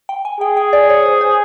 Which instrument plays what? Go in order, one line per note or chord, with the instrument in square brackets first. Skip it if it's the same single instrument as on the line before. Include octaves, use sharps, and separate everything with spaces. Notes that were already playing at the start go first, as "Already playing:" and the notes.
[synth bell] G5
G#5
[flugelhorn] G#4 [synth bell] G5
[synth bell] G5
D5
C#5
C5
C5